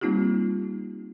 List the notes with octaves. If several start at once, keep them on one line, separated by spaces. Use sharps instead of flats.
G3 A#3 C4 D#4 F4 G4